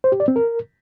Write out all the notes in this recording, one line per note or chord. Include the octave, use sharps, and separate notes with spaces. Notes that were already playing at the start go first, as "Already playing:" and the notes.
C5
G4
D5
C4
A#4